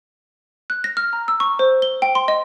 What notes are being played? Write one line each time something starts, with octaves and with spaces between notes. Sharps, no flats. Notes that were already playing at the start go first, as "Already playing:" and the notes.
F#6
A#6
F6
A#5
E6
C#6
C5
G7
G5
C6
D#5